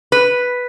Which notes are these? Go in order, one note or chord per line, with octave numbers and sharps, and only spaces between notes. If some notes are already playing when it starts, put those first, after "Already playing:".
B4